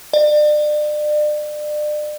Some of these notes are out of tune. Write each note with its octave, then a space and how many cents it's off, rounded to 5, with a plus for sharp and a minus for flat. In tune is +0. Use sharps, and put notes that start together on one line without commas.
D5 +35